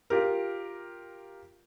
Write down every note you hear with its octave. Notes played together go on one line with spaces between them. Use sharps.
F4 G4 A#4